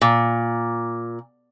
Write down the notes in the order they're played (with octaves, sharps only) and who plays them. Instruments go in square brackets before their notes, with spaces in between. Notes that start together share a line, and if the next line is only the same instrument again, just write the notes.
[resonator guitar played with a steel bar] A#2